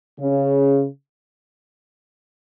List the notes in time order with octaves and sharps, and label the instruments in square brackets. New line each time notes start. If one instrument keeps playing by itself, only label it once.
[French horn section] C#3